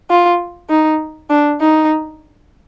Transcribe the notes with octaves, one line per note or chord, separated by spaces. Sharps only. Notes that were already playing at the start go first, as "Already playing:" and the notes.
F4
D#4
D4
D#4